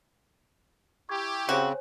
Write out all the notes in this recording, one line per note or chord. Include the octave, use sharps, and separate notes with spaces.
E4 G4 C#6 D6 G#6
C#3 C4 F#4 C5 C#5 G#5